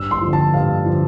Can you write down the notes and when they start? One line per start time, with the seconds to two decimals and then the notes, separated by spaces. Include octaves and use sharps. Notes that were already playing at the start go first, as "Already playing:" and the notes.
Already playing: G2 E6
0.11 C6
0.21 D3 F3
0.33 A5
0.54 G2 F5
0.86 D3 F3